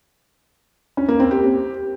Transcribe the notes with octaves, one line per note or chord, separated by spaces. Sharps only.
C#4
A#3
C4
G4